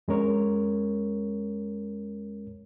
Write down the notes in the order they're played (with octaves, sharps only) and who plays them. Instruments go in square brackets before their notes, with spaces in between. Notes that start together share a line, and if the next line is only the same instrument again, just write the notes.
[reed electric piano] F2 G#3 C#4 A#4 C#5